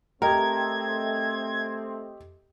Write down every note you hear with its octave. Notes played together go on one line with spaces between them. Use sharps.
A3 C4 G4 A#4 D#5 G5 G#6